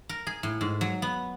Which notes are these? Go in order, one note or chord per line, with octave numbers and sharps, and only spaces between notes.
A#4
G#4
A2
G#2
F#3
B3